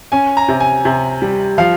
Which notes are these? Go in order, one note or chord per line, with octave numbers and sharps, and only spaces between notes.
C#4 G#5
A#5
C3
G#5
C3
G3
F3 F5